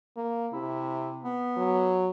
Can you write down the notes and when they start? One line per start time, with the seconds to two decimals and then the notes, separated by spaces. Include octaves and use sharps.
0.17 A#3
0.53 C3 E4
1.24 B3
1.57 F#3